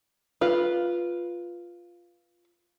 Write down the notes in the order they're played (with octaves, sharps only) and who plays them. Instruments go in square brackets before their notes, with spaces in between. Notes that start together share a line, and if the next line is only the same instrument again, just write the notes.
[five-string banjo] F4 B4